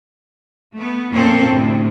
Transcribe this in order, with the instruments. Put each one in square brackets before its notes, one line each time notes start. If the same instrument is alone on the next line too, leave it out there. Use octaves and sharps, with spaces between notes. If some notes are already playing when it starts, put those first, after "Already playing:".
[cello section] A3 B3
F2 A#2 A#3 C4 C#4 A4
D2 A2 C3